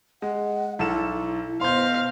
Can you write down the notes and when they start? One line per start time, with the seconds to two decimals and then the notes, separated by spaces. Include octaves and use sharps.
0.22 G#3 F#5
0.79 B1 E4 A4 E7
1.61 B2 C5 F5 C6 G6